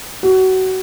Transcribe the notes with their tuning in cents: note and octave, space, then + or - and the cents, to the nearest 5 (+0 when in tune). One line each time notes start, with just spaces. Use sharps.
F#4 +25